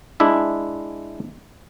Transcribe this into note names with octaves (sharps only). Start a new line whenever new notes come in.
G#3 D4 E4 E5